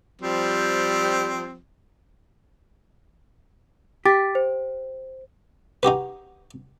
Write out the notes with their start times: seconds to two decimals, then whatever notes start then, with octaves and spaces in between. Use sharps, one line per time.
0.21 F3 G3 C4
4.05 G4 D6 A6 B6
4.35 C5
5.83 D#4 F#4 G4 B4